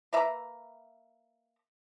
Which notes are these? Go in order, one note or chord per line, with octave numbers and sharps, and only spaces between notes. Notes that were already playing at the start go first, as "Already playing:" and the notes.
A#3 B4 E5 A#5